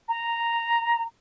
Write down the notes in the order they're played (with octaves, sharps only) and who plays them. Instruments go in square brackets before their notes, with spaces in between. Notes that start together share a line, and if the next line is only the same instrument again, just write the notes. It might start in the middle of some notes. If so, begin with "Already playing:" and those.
[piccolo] A#5